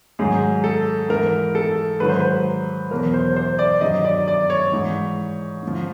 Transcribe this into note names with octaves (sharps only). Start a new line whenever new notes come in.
G#2 D#3 F#3 G#4
A4
G#2 E3 A#4
A4
G#2 D#3 F#3 B4
C5
B4
E2 B2 F#3 A#4
C5
C5
D5
G2 D#3 F#3 D#5
D5
D5
C#5
G#2 E3
G#2 F3